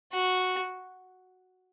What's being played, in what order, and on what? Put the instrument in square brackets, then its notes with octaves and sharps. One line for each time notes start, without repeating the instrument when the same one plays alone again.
[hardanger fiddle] F#4